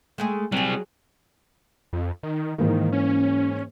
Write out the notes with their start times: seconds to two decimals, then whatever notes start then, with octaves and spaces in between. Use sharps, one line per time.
0.18 G#3 A3 G#4
0.52 F#3 G3 C4 G#4
1.93 F2
2.23 D#3
2.58 G#2 D#3 E3 A#3
2.92 C#4